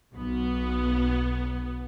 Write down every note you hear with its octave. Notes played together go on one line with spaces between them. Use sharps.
B1 B3